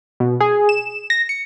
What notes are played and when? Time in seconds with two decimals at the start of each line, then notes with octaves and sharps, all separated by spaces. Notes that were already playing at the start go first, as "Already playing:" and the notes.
0.20 B2
0.40 G#4
0.69 E7
1.10 A#6
1.29 C#7